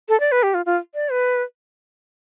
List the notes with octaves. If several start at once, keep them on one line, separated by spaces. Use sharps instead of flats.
A4
D5
B4
G4
F4
F4
D5
B4